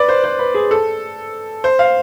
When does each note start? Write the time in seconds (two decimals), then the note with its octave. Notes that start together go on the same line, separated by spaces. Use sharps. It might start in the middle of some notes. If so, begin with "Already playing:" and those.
Already playing: B4 D5
0.09 C5
0.24 C5
0.39 B4
0.54 G#4
0.71 A4
1.64 C5
1.79 F5